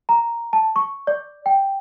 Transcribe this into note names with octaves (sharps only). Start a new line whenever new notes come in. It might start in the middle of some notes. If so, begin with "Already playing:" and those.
A#5
A5
C#6
D5
G5